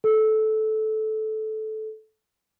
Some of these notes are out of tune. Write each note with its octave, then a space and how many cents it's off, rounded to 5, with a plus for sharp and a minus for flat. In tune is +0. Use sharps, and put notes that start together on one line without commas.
A4 -15